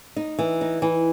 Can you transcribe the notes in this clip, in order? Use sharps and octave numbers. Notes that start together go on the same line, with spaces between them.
D#4
E3
D#4
E3